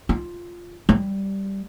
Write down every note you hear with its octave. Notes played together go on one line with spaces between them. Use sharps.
F4
G3